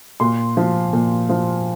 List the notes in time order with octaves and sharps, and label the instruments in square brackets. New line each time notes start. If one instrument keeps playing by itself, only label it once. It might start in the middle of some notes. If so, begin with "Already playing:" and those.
[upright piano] A#2 C6
F3
A#2
F3